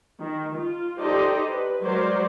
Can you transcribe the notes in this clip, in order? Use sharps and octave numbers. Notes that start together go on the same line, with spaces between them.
D#3
F4
D#4 G4 A4 C5 D5 D#5
B4
F#3 G#3 A#4 C5 D5